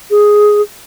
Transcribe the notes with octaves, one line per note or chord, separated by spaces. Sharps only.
G#4